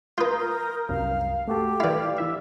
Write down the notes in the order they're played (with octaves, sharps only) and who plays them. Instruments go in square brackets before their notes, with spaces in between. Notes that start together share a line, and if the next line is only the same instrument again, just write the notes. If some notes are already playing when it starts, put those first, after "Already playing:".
[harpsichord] F4 B4 [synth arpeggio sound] A#5 D#6 G6
[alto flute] A#4
[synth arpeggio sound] C2 F#2 A#4 [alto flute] F5
[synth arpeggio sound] A3 F#4 A4 [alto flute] G4
[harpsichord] E3 E4 [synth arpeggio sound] D5 F5
[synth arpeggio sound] E3 E4 E5